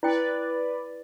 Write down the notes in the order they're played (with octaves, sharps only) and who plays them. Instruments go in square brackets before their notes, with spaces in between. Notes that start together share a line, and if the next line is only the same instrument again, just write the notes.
[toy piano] E4 G5 [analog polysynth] B4 D5